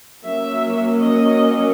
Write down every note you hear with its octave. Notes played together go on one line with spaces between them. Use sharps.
F#3 A#3 C#4 E5
D#5